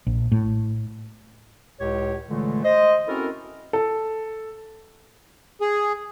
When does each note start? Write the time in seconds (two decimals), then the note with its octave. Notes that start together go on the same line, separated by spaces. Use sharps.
0.07 A#1
0.32 A2
1.80 C#2 A2 G4 C#5
2.29 A#2 D3 E3 G#3 A3
2.64 C5 D#5
3.07 C4 C#4 E4 F#4 A4 A#4
3.73 A4
5.61 G#4